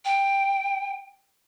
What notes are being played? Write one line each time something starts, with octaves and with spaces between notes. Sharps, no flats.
G5